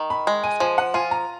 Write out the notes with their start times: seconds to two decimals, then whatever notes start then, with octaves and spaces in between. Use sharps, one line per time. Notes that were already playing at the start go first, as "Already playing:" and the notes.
Already playing: D#3
0.10 B5
0.27 G#3
0.44 G#5
0.60 F3 G#5
0.78 F#5
0.94 F4 G#5
1.11 A#5